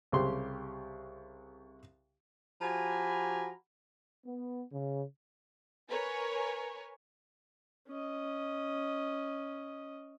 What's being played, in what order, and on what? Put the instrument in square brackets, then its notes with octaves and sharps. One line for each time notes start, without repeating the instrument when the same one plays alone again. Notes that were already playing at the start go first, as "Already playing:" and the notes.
[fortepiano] C2 C#3 G4 C6
[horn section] F3 F#4 G4 G#5 A#5 B5
[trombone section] B3
C#3
[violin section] A#4 B4 C#5 G#5
[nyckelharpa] C#4 D#5